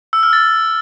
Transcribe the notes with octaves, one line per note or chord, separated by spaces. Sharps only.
E6
F6
A6